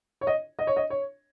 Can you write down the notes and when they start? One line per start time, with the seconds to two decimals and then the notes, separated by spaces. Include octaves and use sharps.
0.21 C#5
0.27 D#5
0.59 D#5
0.67 C#5
0.76 D#5
0.90 C#5